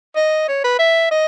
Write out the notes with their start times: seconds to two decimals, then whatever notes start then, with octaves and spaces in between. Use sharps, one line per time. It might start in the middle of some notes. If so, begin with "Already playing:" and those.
0.16 D#5
0.48 C#5
0.64 B4
0.79 E5
1.11 D#5